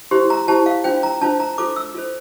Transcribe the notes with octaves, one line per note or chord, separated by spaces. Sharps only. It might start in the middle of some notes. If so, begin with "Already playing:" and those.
E4 G4 C5 C6
A#5
E4 G4 C5 A5
F5
D4 F4 C5 G5
A#5
D4 F4 C5 A5
A#5
F4 A4 C5 D6
E6
F4 A4 C5